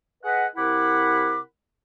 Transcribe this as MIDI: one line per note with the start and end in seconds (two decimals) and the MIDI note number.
0.24 0.46 68
0.24 0.46 71
0.24 0.46 75
0.24 0.46 78
0.56 1.39 48
0.56 1.39 64
0.56 1.39 70
0.56 1.39 78
0.56 1.39 83
0.56 1.39 86